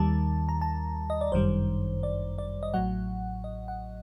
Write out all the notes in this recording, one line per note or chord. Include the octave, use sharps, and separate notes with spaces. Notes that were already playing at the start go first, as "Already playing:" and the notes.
Already playing: D#2 D#3 G3 A5
A#5
A5
D#5
D5
G1 F#2 D#3 G3 C5
D5
D5
D#5
A1 A2 F#3 F#5
D#5
F#5